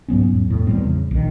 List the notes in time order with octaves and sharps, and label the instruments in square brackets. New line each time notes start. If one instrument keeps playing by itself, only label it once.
[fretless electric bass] G#2 F#3 B3 C#4
E2
A2
E2 G3 C4
C#3
A#1 D#3